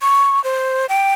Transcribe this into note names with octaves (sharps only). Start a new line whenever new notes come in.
C#6
C5
G5